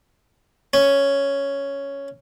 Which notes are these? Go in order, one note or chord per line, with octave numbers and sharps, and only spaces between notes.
C#4